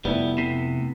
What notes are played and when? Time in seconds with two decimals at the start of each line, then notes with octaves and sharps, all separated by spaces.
0.05 F1 G3 A3 B3 E4
0.38 C3